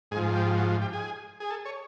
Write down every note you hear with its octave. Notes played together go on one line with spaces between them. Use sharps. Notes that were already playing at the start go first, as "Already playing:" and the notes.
G#2 G#4
F3
G4
F#4
G4
G#4
G#4
A4
C#5